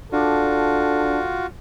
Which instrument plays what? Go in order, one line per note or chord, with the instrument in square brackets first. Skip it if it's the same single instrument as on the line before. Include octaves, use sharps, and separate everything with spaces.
[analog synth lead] D4 [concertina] F4 F#4 [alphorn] A4